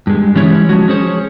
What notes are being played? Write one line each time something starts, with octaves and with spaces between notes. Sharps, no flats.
G2 G#3
E3 G3 G#3 C#4 E4 C#5
F3 G#3 F#4
C#4 G#4 C5 C#5